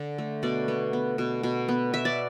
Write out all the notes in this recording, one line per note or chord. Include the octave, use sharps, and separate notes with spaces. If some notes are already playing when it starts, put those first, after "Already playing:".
Already playing: D3
A3
B2 D5
B3
B3
B2
B2
B3
B3 E5
D5